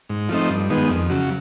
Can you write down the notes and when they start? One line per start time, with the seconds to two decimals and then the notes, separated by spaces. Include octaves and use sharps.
0.09 G#2
0.29 F3 A3 C4 D#4
0.50 G2
0.70 D#3 G#3 B3
0.89 F2
1.10 C#3 F#3